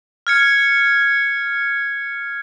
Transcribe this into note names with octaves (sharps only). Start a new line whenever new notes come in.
F6 G#6 C#7